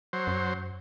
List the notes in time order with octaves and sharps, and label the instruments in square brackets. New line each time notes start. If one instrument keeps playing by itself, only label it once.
[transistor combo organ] F#3 C5
[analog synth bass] F#2